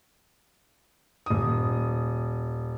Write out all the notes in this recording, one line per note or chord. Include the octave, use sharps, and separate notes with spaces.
D#1 D#6